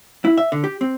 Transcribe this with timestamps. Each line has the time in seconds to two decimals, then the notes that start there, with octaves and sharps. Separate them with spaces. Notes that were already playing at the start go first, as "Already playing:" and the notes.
0.25 E4
0.37 E5
0.52 D3
0.64 G4
0.81 C4